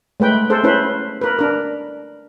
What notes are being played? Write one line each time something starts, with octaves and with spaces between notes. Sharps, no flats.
G#3 A3 B4 G5
G#4 A4 C5
C#4 E4 B4 C5
A#4 B4
D4 A#4